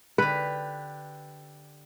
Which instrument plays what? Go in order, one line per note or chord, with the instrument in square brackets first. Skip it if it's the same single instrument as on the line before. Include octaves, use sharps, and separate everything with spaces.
[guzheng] D3 G4 [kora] B4